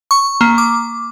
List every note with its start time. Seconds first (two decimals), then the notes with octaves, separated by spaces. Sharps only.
0.11 C#6
0.41 A#3
0.58 D6